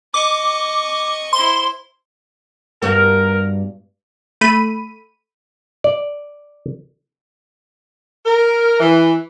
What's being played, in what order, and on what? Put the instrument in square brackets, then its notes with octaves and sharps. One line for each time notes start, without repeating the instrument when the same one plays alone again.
[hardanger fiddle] D#5 C#6 [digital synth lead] D6
[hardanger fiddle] E4 C5 [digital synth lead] C6
[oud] G2 B3 F#4 [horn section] A#4
[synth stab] A3 B5 D#7
[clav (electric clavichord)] D5
[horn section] A#4
E3